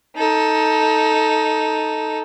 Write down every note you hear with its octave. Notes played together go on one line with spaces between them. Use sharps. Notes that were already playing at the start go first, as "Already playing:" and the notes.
D#4 A4